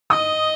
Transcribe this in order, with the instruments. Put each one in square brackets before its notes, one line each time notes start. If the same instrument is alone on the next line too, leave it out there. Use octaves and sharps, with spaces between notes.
[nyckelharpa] D#5 [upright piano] D#6